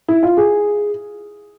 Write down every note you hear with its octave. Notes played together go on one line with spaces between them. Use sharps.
E4
F4
G#4